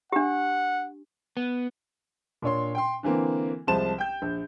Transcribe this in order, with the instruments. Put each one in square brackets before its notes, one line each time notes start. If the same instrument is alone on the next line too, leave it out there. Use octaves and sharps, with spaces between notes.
[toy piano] D4 G4 [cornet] F#5
[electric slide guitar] B3
[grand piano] A#2 D4 C#5 C6
G5 C6
D3 E3 A#3 C4
C2 F3 G#3 C5 A5 E7
G5 G6
A#1